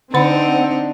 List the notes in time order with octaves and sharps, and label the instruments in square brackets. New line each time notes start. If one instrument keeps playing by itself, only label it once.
[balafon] D3 B5 [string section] C4 [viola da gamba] D4 D#4 [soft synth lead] F#5